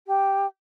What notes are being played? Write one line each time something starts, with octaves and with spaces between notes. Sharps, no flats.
G4